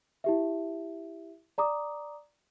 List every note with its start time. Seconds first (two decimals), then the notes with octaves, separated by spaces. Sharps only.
0.24 E4 G4 E5
1.58 D5 A#5 D6 D#6